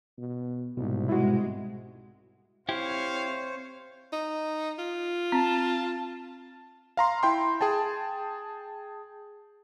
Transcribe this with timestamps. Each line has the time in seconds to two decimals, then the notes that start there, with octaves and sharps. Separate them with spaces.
0.18 B2
0.77 C2 G#2 B2
1.09 G#3 E4 F#4
2.69 C4 E4 G4 C5 C#5 F5
4.13 D#4
4.79 F4
5.32 C4 A5
6.97 F5 A#5 C6
7.23 E4 G5 C6
7.61 G#4 G5 A5